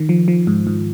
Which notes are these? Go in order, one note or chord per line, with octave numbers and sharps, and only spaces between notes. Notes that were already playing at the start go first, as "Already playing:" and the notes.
Already playing: D#3
F3
F3
G#2
G#2